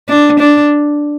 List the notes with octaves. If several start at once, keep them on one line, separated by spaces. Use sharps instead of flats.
D4
D4